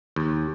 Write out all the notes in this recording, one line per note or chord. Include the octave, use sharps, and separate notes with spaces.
D#2